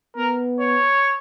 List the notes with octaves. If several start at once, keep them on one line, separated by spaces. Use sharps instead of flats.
B3 A#4
C#5